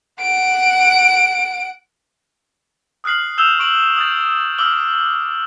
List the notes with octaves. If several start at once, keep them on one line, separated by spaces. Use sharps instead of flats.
F#5 D7
D#6 F6 F#6 C7 F#7
E6 G6 E7 F7 G7
C#6 D7 F#7
D#6 G6 A6
D6 E6 F6 F#7 G7